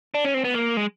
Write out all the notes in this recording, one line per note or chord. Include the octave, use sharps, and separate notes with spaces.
D4
C#4
C4
B3
A#3
G#3